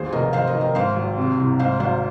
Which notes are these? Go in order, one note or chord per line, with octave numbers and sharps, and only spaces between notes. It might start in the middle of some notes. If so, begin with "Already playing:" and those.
Already playing: G#1 D#2 G#4 C5
F1 A#4 D#5
D#3 C5 F5
A#4 D#5
D#3
A#4 D#5
G#2 C5 F5
G#1
C3
C2
G#2 C5 F5
G#1 C5 F5